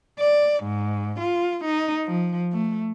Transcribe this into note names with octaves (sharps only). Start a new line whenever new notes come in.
D5
G#2
F4
D#4
F3
A3